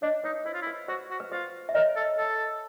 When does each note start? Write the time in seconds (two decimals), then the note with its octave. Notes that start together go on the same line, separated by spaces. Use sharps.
0.02 D4 C#5 D#5
0.24 D#4 B4 C#5
0.45 E4 C5
0.54 F4
0.62 E4
0.67 B4
0.88 F#4 C5
1.11 F#4
1.20 B4
1.32 F4 C5
1.69 E5
1.74 A#4 C#5 D#5
1.96 A4
2.18 A4